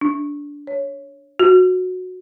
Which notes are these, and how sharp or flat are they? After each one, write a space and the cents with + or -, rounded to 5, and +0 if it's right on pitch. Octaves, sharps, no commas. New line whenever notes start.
D4 -15
C#5 +0
F#4 -15